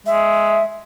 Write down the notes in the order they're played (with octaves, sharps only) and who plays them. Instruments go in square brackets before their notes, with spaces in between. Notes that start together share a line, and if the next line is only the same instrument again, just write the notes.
[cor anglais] G#3 [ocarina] E5